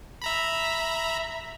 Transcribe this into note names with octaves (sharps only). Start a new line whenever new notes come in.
E5 A#5 B5